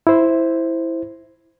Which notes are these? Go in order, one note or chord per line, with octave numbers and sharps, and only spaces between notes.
E4 C5